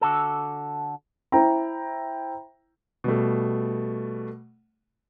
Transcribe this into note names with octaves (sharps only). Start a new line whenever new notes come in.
D3 F#4 A4
E4 C5 G5 A#5
B2 G3 A3